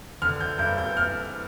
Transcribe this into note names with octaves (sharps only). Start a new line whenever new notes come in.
D3 F6
G6
G2 G6
G6
F6